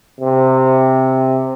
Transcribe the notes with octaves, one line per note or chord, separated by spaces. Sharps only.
C3